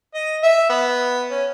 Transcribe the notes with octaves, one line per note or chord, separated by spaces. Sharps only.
D#5
E5
B3
C#4